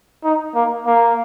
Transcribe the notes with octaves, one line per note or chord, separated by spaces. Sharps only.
D#4
A#3
A#3